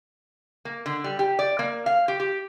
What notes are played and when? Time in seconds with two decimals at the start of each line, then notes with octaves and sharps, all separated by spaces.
0.65 A#3
0.86 D3
1.04 G3
1.19 G4
1.39 D5
1.59 A#3
1.86 F5
2.08 G4
2.20 G4